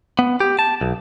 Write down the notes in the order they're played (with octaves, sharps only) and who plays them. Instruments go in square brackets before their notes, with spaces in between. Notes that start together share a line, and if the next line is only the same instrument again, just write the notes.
[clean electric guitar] B3
G4
A5
B1